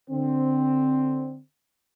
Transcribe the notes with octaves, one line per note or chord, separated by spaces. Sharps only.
D3 C4